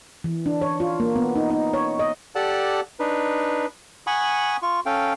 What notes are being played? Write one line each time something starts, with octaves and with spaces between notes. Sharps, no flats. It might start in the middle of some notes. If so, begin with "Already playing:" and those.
E3
D4
C#5
F4
A#3
B3
D#4
D#4
C#5
D#5
G4 A4 D5 F#5 A5
D4 D#4 B4
F#5 G#5 B5 C#6 D#6
F4 C#6
C#4 A4 F5 G5